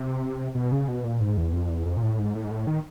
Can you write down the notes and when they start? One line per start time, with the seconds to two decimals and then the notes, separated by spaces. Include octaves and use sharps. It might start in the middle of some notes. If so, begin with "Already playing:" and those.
Already playing: C3
0.55 B2
0.72 C#3
0.88 B2
1.04 A#2
1.20 G#2
1.37 E2
1.53 F2
1.69 E2
1.85 F2
1.97 A#2
2.03 A2
2.19 G#2
2.35 A2
2.44 G#2
2.51 A2
2.67 D#3